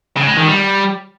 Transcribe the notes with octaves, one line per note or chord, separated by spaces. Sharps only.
C#3
G#3
D#3
G3